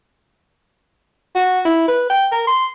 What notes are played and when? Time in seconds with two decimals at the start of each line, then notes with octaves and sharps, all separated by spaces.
1.35 F#4
1.65 E4
1.88 B4
2.10 G5
2.32 A#4
2.47 C6